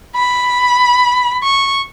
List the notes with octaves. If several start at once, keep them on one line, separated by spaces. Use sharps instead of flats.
B5
C#6